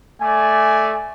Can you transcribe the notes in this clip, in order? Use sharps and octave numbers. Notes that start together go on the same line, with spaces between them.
A3 D5 G#5